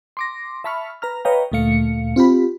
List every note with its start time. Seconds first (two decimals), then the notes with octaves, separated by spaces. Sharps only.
0.17 C6 D6 A#6
0.64 E5 A5 B5 C#6 F6
1.02 B4 A#5 F6
1.25 B4 C#5 D#5 F5 G5 A#5
1.52 D2 A#2 A3 F5 C#7
2.16 C4 F4 G4 B5